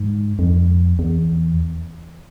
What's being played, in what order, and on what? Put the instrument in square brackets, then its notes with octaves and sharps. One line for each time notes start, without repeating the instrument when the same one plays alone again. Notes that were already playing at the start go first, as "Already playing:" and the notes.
Already playing: [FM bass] G#2
F2
E2